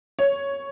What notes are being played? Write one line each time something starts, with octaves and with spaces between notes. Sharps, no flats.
C#5